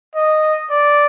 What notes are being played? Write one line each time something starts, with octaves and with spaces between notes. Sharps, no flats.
D#5
D5